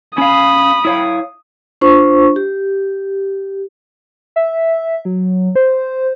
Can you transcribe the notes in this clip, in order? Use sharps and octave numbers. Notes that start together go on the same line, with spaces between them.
C#4 F5 B5 D#6
E4 C#5 F5
D4 F4 C5 C#6
G4
E5
F#3
C5